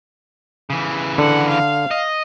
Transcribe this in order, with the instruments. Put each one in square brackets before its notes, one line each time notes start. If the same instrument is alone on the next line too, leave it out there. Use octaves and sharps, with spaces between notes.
[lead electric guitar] C#3 E3
[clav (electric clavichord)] D3 [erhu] F#5
[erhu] F5
[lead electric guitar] D#5